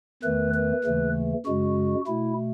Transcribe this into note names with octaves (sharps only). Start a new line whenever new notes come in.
E2 D#3 A3 B4
B4
D#2 C#3 E3 A3
F#2 C#3 G#3 F#4
B2 A3 E4